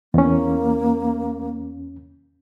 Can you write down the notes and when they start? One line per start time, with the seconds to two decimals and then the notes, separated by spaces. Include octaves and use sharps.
0.14 E2 A#3 C#4